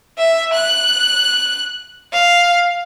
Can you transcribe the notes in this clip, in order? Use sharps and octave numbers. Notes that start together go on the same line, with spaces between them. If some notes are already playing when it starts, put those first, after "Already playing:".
E5
F#6
F5